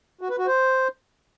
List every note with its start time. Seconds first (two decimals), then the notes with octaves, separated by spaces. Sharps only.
0.21 F#4
0.30 B4
0.38 F#4
0.47 C5